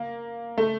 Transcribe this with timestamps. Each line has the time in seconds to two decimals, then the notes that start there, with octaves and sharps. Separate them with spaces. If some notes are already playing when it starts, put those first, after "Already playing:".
Already playing: A#3
0.58 A3